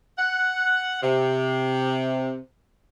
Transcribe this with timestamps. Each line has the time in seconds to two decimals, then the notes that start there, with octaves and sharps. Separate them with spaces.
0.18 F#5
1.02 C3